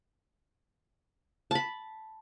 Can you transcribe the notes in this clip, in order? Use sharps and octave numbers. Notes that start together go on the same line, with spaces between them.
A5 B5